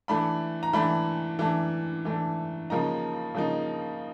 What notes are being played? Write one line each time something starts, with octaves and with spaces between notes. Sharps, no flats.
E3 A3 D4 B5
A#5
E3 A3 D4 B5
E3 A3 D4
E3 A3 D4
C#3 F3 A#3 D#4 A#5
C#3 F3 A#3 D#4